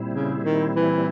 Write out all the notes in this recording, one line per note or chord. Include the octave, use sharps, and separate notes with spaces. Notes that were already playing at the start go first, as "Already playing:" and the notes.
Already playing: A#2 G3 C4 E4
C#3
D#3
E3